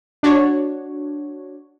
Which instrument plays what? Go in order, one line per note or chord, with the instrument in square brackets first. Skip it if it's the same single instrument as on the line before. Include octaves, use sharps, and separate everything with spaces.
[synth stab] D4 F#4 C#5